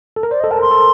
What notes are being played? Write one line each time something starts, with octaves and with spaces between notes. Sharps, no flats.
A4
A#4
C5 D5
A4 D#5
A#4 A5
C6
A4